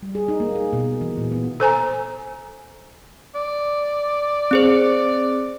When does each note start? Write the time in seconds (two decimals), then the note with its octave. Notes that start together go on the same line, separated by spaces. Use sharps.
0.03 G3
0.15 G#4
0.28 D#4
0.40 A#3
0.55 G#4
0.73 B2
1.01 E3
1.18 A#2
1.32 B3
1.60 A4 C5 G#5 A#5
3.35 D5
4.51 C4 G#4 C5